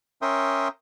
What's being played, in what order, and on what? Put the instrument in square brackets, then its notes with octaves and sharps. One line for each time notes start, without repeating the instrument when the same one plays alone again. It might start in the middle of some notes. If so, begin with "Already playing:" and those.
[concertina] C#4 A#4 E5 G5 C6 D#6